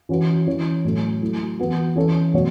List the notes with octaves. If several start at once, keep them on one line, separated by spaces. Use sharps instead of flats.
E3 C#4 F#4 B4
E3 C#4 E4 C#5
A2 F#3 A3
F#3 A3 E4
E3 B3 F#4
E3 C#4 A4 C#5
B2 F#3 A3 F#4 C#5